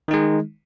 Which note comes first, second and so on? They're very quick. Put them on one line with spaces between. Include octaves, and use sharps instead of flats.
D#3 D#4 G#3